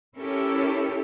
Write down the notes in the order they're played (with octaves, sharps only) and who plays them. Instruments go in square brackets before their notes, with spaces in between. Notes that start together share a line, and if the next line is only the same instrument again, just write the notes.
[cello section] C#4 E4 G4 A4 A#4 C#5